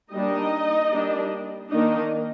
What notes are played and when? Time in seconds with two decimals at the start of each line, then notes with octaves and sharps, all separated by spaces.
0.12 G3 A#3 D4 D#4 D#5
0.92 G3 A#3 D4
1.71 D#3 A#3 D4 D#4 D#5